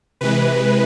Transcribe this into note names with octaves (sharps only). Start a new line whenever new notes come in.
C3 E3 G#3 B4